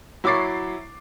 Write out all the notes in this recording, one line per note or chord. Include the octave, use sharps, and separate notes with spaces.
F#3 E4 C#6 D6 A6 C7